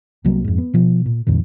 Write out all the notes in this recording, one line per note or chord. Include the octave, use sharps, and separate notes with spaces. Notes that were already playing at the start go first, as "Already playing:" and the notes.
C2 C3 F#3 A#3
F2 G#2
B3
B2 F3
A#2
C2 F2 A#2 D#3